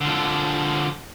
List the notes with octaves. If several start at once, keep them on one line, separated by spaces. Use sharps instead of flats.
D3 F3